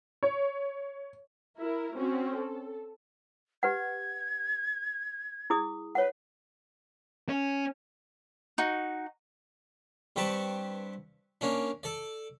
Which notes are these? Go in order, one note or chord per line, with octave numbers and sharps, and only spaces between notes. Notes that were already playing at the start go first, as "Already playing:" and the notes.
C#5
E4 A#4
C4 C#4 F#4
A4
G4 B4 F#5 G#6
E4 G#4 D#6
B4 C#5 F#5
C#4
D#4 F#4
G2 C4 G4 B4 A5 C#6
A#3 C#4 D4
A4 D5